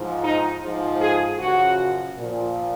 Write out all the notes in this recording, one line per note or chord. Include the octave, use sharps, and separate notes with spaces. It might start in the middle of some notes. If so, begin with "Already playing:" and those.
Already playing: G#2 F3
D#4
G#2 F3
G#4
F#2 C#3 F3 F#4
A#2 F3